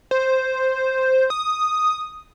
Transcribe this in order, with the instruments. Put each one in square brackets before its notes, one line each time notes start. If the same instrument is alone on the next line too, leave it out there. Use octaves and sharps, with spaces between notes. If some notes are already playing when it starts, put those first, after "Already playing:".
[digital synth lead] C5
D#6